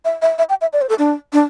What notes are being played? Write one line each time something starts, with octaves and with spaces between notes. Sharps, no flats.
E5
E5
E5
G5
E5
D5
C5
A4
D4
D4